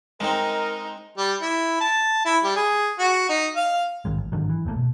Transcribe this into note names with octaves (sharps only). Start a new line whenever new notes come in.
G#3 C4 D#4 A#4
G3
E4
A5
E4
G3
G#4
F#4
D#4
F5
A#1 G#2 D#3 G#3
A1
G#2 D3 D#3 F#3
E3
G#1 G#2 A3 A#3
B2